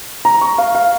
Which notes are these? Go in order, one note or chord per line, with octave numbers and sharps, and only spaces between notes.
A#5
C#6
F5
F5